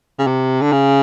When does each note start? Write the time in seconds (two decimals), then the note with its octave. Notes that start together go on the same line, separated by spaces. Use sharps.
0.19 C#3
0.27 C3
0.61 D3
0.73 C#3